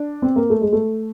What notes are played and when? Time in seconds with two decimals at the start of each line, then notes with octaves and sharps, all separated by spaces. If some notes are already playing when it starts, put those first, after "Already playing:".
Already playing: D4
0.22 C4
0.36 A#3
0.50 A3
0.61 G#3
0.73 A3